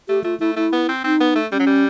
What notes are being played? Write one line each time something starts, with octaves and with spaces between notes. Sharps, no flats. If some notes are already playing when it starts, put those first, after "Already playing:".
A3 G4
A3 F4
A3 E4
A3 E4
B3
C4
C4 D#4
B3
A3
G3 C#4
F#3
G3